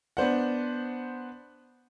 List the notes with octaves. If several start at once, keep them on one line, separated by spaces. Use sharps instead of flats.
B3 D4 C5 F#5